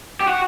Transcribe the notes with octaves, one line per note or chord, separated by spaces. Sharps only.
G4
F#4